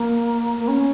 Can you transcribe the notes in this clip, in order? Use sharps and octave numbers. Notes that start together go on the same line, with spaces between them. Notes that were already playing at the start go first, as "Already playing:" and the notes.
Already playing: A#3
A#3
C#4